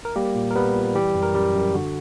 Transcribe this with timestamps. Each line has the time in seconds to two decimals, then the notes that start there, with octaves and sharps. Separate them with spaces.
0.05 A#4
0.16 G3 A#3 G4
0.35 A#2
0.51 A#4
0.55 G3 B3 B4
0.75 A#2
0.95 E3 G3 G4
1.15 F#2
1.22 A#4
1.34 F#2 G3 G4
1.55 F#2
1.74 D3 F#4